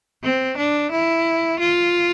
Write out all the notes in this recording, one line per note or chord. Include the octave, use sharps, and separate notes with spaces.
C4
D4
E4
F4